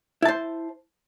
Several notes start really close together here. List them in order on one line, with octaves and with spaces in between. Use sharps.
E4 A5 C5